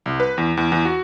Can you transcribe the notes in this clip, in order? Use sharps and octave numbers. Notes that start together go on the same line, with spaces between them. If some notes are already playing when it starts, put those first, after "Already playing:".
C2
B4
E2
E2
E2
F#4